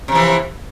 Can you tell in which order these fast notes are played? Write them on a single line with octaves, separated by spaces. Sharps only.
C3 F3 E3